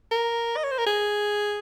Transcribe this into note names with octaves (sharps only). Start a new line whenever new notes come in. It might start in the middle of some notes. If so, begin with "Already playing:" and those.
A#4
D#5
C#5
C5
A#4
G#4